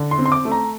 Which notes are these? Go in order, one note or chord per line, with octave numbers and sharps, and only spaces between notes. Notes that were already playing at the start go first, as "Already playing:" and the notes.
Already playing: D3
C6
C4
C6
D6
A3
A#5